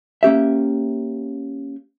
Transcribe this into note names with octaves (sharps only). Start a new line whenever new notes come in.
A#3 C#4 G4 E5